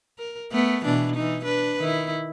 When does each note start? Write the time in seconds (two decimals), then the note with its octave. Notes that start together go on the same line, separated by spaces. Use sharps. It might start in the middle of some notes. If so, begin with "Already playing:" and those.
0.19 A#4
0.52 A3 B3
0.84 B2 E3 D4
1.15 E3 D#4
1.45 D4 B4
1.79 D#3 E4